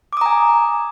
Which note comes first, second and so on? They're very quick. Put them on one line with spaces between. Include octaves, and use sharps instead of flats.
D6 D#6 A#5 G#5